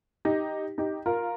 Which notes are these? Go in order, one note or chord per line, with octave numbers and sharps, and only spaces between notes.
D#4 G4
D#4 G4
F4 A#4